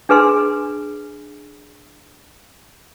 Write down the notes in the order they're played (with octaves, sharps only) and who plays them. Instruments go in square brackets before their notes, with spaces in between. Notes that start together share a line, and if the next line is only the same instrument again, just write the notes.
[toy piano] D4 G#4 B4 G#5 C6